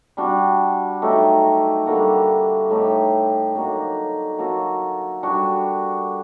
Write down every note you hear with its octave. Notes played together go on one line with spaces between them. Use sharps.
G3 D4 F#4
F#3 A3 D#4 G4
D3 G3 A#3 F#4
A2 A3 D#4 G4
D3 F#3 A#3 D#4
F#3 A#3 F#4 A4
G3 D4 F#4